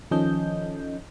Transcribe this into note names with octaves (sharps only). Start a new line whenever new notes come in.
D#3 F3 C#4 A4 D#5 G6